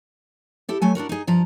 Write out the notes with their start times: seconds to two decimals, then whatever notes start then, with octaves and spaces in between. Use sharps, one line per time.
0.69 E4 G4 A4
0.82 F#3 A3 G#5
0.95 D4 E4 F#4 A#4
1.09 D#4 G#4
1.27 G2 F3 A#5